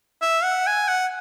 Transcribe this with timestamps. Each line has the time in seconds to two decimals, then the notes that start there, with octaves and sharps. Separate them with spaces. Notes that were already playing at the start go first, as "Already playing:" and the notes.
0.22 E5
0.44 F#5
0.67 G#5
0.88 F#5